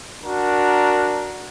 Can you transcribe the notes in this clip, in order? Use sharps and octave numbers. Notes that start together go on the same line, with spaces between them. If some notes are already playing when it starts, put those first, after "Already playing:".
D4 F#4 A#4